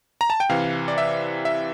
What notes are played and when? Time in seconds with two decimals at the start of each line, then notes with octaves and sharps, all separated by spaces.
0.21 A#5
0.30 A5
0.40 G5
0.49 C3 E3 F5
0.88 D5
0.98 E5
1.45 E5